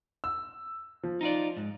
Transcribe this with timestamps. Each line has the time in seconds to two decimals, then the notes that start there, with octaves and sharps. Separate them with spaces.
0.24 E6
1.03 F3
1.21 D#4 F4 D5
1.56 G#2